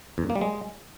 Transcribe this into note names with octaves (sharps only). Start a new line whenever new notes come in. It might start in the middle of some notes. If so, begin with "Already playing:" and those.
E2
F#2
A#3
G3
G#3